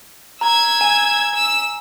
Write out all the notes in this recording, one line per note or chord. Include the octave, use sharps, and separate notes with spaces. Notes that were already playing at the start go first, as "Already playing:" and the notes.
A#5 E6 G#6
G#5
E6